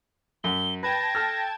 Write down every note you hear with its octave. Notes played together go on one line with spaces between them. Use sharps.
F#2 G7
B4 G5 A5 G#6 A#6
A4 F6